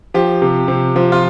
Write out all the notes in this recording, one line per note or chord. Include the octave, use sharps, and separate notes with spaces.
F3 G4
C3
C3
F3
F4